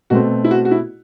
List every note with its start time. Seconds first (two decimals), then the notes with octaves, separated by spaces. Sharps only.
0.10 B2 A3 C4 F#4
0.44 E4
0.51 F#4
0.65 F#4
0.71 E4